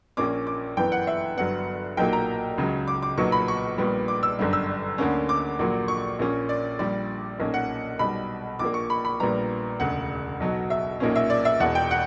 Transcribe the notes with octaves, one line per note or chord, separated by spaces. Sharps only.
A#1 A#2 A#3 C#4 D6
D6
G1 F#2 E3 B3 G5
F#5
E5
G1 G2 F#3 B3 F#5
B1 A#2 F#3 A#3 G5
A#5
C#2 C#3 F#3
D6
D6
B1 A#2 F#3 B3 C#6
B5
C#6
A#1 A#2 G3 B3
D6
E6
G1 F#2 D3 G3
E6
D2 D3 A#3 C#4
D6
A#1 A#2 F#3 A#3
C#6
A#1 A#2 A#3 C#4
D5
A#1 A#2 G3 D5
B1 A#2 A#3 C#4
F#5
B1 B2 G3 B5
A#1 A#2 A#3 D6
C#6
B5
B5
A#1 A#2 G3 B3 A#5
E1 D2 C#3 F#5
B1 B2 F#3
E5
B1 A#2 A#3 C#4
E5
D5
E5
E1 E2 B2 F#5
G5
F#5